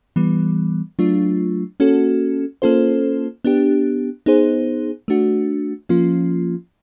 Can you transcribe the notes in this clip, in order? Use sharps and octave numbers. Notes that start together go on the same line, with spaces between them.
E3 G3 B3
F#3 A3 D4 F4
A#3 C#4 F#4 A4
A#3 C#4 F4 A4 C5
B3 D4 G4
B3 D#4 G#4 C5
A3 D4 F#4
F3 A#3 C#4 F4